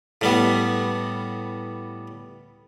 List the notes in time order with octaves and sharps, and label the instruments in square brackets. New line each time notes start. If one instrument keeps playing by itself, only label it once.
[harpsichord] A2 G3 B3